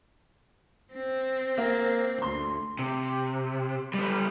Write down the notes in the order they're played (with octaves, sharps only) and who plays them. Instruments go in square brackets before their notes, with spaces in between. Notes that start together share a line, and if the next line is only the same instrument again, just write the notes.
[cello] C4
[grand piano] A#3
[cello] D2 [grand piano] C6
[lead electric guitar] C3
G3 B3